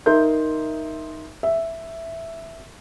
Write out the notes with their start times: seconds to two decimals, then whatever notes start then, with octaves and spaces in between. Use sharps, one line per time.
0.06 D#4 A#4 E5 C6 G6
1.43 E5